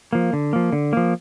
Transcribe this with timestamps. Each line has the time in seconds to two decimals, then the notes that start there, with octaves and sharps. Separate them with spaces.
0.13 F3 A#3
0.33 D3
0.53 F3 A#3
0.72 D3
0.93 F3 A#3